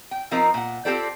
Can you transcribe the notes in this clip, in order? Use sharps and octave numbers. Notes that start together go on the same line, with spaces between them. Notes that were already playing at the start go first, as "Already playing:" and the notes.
G5
F3 C4 D#4 A#4
A#2 F#5
C4 F4 G4 A4 C5 D5